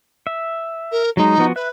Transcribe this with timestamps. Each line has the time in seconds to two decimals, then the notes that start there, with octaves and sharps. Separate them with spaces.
0.27 E5
0.92 A#4
1.17 F#3 G#3 D#4
1.38 F3 B3 F#4
1.56 B4 E5 F#6